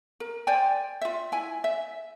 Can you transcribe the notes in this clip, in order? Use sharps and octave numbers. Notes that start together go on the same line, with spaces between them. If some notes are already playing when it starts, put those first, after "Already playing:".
A#4
C5 D5 G5 G#5
F4 E5
E4 G#5
E5